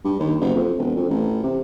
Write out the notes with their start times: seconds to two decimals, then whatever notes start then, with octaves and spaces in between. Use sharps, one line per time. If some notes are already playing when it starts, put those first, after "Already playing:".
0.04 G2
0.20 D#2
0.41 F#1
0.54 F2
0.78 E1
0.96 F2
1.09 A1
1.43 C3